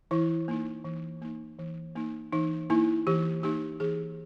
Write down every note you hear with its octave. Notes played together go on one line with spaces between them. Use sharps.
E3 E4
A#3 D#4
E3
A#3 D#4
E3
A#3 D#4
E3 D#4
A#3 D#4 E4
E3 G4
A#3 D#4 G4
E3 G#4